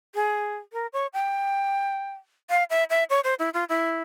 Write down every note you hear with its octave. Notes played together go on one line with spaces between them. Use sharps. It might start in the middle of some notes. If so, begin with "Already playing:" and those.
G#4
A#4
C#5
G5
F5
E5
E5
C#5
C5
E4
F4
E4